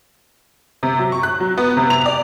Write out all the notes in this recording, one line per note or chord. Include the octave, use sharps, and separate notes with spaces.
C3
F#3
C#6
F#6
F#3
B3
C3
F7
D5